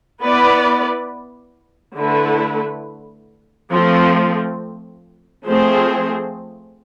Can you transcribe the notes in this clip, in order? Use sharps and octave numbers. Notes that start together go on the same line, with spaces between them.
B3 E4 B4 D5
D3 A3 E4 B4
F3 A3 C4
F3 A3 C4 G#4 C5